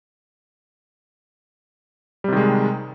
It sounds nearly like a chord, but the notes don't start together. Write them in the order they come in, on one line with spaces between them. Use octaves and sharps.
G3 C3 D#3 G#3